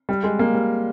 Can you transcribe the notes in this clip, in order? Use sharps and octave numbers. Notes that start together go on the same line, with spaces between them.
G3
G#3
A#3
G3